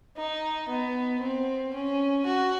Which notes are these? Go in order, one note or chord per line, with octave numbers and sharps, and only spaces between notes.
D#4
B3
C4
C#4
F#4